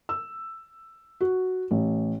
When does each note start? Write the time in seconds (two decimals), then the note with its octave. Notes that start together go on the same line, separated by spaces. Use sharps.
0.09 E6
1.21 F#4
1.71 A1